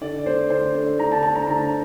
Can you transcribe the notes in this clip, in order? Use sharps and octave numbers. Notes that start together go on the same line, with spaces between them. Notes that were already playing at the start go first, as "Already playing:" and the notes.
D3 D5
A3 D4 C5
D3 C5
A3 D4
D3 A#5
A5
A3 D4 A5
A#5
D3 A#5